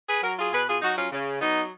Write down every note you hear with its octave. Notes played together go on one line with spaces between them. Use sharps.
G#4 B4
F#3 F#4 A#4
F4 G#4
B2 G#4 B4
F4 G#4
F#3 D#4 F#4
C#4 F4
C#3
F#3 B3 D#4